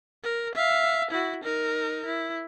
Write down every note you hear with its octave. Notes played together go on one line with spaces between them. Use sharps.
A#4
E5 F5
E4 F#4
D#4 A#4
E4